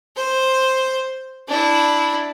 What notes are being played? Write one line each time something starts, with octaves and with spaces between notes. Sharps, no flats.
C5
D4 E4